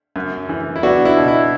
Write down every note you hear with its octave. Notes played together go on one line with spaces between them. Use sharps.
F#2
E3
E4
B3 D4 F#4
E4
B2
E4